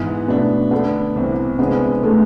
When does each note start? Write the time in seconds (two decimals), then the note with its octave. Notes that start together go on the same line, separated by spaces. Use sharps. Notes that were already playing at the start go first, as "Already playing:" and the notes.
Already playing: G#2 E3 B3
0.28 B2 A3 B3 D4
0.71 D3 A3 B3 D4 A4
1.15 C2 C3 E3
1.59 C3 E3 G#3 B3 D4 G#4
2.02 D3 G#3 A3 B3